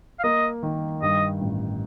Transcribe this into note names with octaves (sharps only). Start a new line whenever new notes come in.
F5
A#3 D#5
D#3
G2 D#5
A1